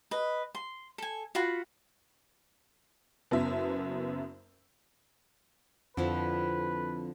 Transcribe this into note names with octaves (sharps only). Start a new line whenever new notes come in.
B4 D#5
C6
A4 G#5
F4 F#4 F#5 B5
F#1 F#2 B3 E5
F2 D3 F3 E4 B4